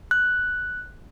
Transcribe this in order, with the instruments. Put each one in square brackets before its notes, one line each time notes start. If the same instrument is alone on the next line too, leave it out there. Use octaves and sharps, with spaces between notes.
[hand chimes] F#6